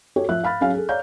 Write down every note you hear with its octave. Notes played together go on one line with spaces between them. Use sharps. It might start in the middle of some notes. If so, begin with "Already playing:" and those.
F#4 G4 A4 C#5
F3 E5 F#6
F5 B5 F6 A6
F#3 C#4 G#4 F5
G#4 A4
C#5 D5 F5 A#5 G6